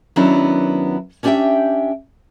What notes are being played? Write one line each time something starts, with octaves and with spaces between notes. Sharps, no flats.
D#3 F#3 B3 C#4 D4 E4
C#4 D4 G4 D5 E5 G5